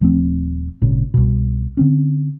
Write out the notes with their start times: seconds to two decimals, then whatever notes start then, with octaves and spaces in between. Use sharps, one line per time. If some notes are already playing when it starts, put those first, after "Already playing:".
0.01 D#1 F3 A3 C4
0.82 G#1 A#2 C#3
1.14 C2 B2
1.77 D3 C4 C#4